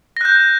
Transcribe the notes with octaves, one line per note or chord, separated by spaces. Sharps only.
F#6 G6 A#6